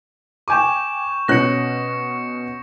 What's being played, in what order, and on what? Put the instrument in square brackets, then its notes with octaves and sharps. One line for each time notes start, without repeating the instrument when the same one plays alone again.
[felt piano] G5 G#5 D6 [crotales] C#6 G6 E7
[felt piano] B2 C#4 F#6 [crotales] A#6 C#7